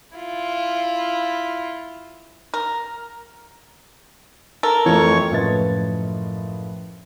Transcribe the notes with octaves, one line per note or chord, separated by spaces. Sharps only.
E4 F4
A#4
A4 A#4
F2 E3 F3 A3 C#5 C#6
F#1 A2 F3 B4 D#5 A6